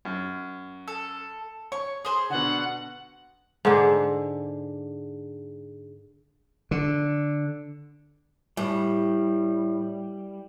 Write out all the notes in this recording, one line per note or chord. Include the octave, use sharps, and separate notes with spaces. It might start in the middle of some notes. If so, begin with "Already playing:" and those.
F#2
A4
C#5 C#6
G#4 C5 C6 D#6
B2 D3 F#5
G#2 D3
D3
A2 G3